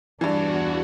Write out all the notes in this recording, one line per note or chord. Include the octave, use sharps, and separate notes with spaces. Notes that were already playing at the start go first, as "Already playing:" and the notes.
E2 G2 E3 D4 F#4